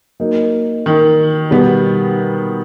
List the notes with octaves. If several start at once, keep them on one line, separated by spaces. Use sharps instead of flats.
F#3 A#3 D#4
D#3
B2 G3 B3